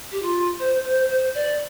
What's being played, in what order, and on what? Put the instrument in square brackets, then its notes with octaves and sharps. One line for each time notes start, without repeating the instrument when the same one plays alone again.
[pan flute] G4
F4
C5
C5
C5
D5